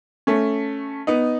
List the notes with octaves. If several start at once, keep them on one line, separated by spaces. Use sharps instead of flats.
A3 C#4
B3 D#4